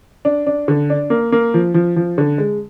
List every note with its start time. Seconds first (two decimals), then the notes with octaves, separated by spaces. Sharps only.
0.25 D4
0.47 D4
0.68 D3
0.90 D4
1.10 A#3
1.32 A#3
1.54 F3
1.74 F3
1.96 F3
2.18 D3
2.38 G#3